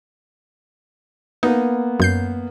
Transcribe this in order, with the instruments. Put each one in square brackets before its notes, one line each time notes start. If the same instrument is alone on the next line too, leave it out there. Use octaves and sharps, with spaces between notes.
[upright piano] A#3 B3 [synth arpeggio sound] D#4
[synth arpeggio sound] F#2 G6 C7